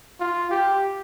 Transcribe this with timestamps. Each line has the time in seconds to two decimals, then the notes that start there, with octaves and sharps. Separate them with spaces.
0.20 F4
0.51 G4